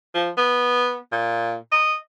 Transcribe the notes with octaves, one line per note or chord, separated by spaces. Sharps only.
F3
B3
A#2
D#5